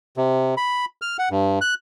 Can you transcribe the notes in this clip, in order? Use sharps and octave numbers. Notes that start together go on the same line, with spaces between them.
C3
B5
F6
F#5
G2
F#6